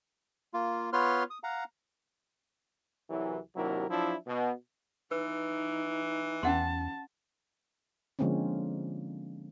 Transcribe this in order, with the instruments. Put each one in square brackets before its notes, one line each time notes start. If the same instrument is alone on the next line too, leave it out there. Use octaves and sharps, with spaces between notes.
[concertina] A#3 F4
B3 F4 B4 C#5 C6 F6
D#6
F5 F#5 A#5
[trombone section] C2 E3 F#3
D#2 C3 F#3 D4 E4 A#4
F3 F#3 D4 E4
B2
[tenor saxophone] E3 [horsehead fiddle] D#4 [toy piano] B4
[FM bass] E2 [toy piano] C#4 F#5 C6 [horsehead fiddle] A5
[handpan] D3 F3 G#3 A#3 C4 C#4